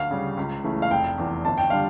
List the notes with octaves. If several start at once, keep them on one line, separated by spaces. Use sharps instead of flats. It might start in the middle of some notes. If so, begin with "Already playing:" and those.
Already playing: D2 F5
C#3 G3
C#2
C#3 E3 A3
F5
F1 G5
E2 E3
G1 A5
G5
D3 G3 F5